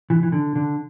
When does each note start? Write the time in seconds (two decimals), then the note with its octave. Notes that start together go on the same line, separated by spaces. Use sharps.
0.10 E3
0.23 E3
0.32 D3
0.55 D3